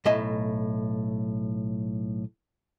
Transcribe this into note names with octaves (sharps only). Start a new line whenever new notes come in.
B1 A2 D#5 E5 G#5